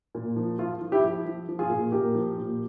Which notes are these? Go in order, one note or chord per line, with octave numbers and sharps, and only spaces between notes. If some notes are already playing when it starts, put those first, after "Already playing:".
A#2
F3
F3 F4
F3
E4 G4
F3
F3
F3
F4 G#4
A#2
A#2 G4 A#4
F3
A#2